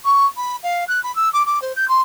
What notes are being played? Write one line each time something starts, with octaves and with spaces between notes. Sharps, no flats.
C#6
B5
F5
F#6
B5
E6
D6
D6
C5
G6
C6